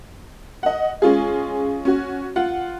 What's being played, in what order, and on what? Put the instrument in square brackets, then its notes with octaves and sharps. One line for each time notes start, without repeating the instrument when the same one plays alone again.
[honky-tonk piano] D#5 F#5
G#3 C#4 F4 G#4
C#4 F#4
F4 F#5